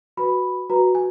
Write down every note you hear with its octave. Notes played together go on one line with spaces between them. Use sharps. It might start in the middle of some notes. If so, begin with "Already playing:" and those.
F#4 B4 B5
F#4 B4 A#5
G#5